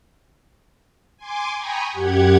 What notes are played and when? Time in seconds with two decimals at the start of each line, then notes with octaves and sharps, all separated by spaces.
1.17 G#5 C6 D6
1.56 G5 G#5 A#5 B5 C#6 D#6
1.91 F#2 G4 F#5 G#6